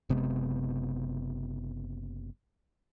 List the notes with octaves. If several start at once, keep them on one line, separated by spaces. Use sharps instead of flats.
F#1 C3 G#3 B3